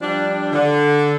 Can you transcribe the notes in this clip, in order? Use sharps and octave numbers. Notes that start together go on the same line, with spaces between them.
F3 G3 D4
D3